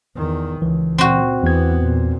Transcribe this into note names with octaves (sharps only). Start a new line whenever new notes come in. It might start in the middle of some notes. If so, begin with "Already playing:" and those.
E2 D#3
C#2 E3
A#2 C4 F#4
E2 E3 B3 G#6
A#2